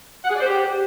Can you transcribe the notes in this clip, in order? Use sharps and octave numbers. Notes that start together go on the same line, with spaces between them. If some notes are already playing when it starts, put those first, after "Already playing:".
F#5
G#4
D5
C5
G4